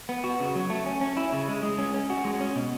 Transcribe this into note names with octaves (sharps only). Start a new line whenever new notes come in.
B3
F#4
C#3
F#3
A3
C#4
C#4
E4
C#3
G#3
G#3
C#4
C#4
F#4
G#3
C#4
B2